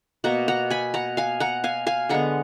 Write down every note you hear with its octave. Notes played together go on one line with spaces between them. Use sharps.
B2 A#3 F#5 A#5
F#5 A#5
G#5 B5
F#5 A#5
F5 G#5
F#5 A#5
F5 G#5
F5 G#5
D3 G#3 B3 F#5 A#5